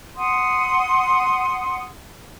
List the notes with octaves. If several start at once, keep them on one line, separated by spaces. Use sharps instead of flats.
F#5 C6 D#6